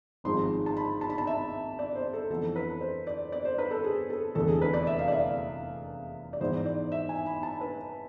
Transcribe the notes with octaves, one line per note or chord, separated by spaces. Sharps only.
G#1 G#2 F3 G#3 C6
A5
B5
A5
B5
A5
E5
D5
C5
A4
F2 E3 B3 A4
B4
C5
D5
D5
C5
B4
A4
G#4
A4
F1 E2 D3 A4
G#4
B4
D5
E5
F5
D5
E5
D5
G#2 E3 B3 E4 C5
D5
E5
G#5
B5
A5
B4